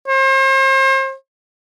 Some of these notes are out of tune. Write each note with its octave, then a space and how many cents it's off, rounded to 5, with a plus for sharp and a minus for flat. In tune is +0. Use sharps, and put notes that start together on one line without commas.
C5 +40